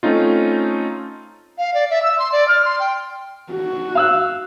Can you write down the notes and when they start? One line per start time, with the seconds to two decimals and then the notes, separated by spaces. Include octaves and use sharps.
0.03 A3 C4 C#4 D#4 F4
1.58 F5
1.74 D5
1.90 E5
2.03 E6
2.19 C6
2.32 D5
2.48 F6
2.65 C6
2.80 G5
3.51 F#4
3.95 F5 E6 F#6